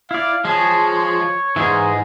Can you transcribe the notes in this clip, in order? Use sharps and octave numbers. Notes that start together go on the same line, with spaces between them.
E4 D5 F5
F3 G#3 G#4 C#5
G#2 E3 G#3 G#4